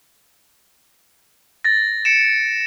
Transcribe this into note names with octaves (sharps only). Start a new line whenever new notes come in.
A6 A#6
C#7 D7 E7